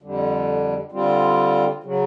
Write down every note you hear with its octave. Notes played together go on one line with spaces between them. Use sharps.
F2 D3 G3
D3 G3 C4 F4
C#3 F#3